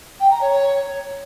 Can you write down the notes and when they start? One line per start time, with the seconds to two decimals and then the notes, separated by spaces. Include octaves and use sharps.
0.20 G5
0.31 A#5
0.41 C#5